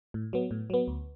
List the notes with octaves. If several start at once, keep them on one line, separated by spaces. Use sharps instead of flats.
A2
F#3 B3
A2
F#3 B3
D2